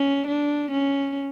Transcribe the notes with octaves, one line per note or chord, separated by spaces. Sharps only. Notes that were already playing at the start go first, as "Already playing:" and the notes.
Already playing: C#4
D4
C#4